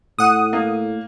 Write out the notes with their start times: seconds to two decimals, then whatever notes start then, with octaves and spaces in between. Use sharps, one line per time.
0.19 A2 F#5 D#6
0.53 A#3